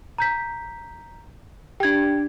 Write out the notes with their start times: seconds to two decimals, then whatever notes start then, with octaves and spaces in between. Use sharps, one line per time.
0.18 A#5 G6 B6
1.80 D4 G4 G5 G#6